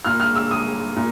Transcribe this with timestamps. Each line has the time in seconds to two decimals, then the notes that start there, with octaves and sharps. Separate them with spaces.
0.05 A#2 F6
0.20 F6
0.35 E6
0.51 D#6
0.96 A#2